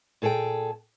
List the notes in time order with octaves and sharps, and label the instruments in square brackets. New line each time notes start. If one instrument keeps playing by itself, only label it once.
[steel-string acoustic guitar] A#2 G#4 A4 B4 G5